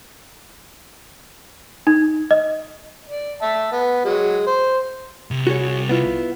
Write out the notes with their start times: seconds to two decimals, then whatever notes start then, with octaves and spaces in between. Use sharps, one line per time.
1.87 D#4
2.31 D#5
3.08 D5
3.42 E5 A5
3.72 B3
4.05 F#3 G#3
4.47 C5
5.31 C2
5.47 F#4 G#4 C#5
5.89 B3 E4 F4